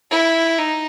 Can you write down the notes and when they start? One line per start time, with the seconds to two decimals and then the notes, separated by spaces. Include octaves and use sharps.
0.11 E4
0.58 D#4